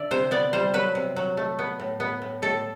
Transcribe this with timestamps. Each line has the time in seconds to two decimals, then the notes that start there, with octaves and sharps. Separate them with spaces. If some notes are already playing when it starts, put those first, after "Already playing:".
Already playing: D3 D5 E5
0.11 C3 C5
0.31 B3 D5
0.53 G3 C5
0.74 F#3 B4
0.95 C3
1.16 F#3
1.37 A3
1.59 B3
1.79 A2
2.00 B3
2.22 A2
2.42 A2 A4